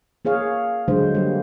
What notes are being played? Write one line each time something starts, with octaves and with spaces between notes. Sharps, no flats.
A#3 G#4 C#5 F5
D3 F#3 G#3 C5
G3 A#3